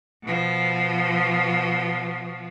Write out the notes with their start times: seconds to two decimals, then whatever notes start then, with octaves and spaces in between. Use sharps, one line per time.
0.24 B2 F3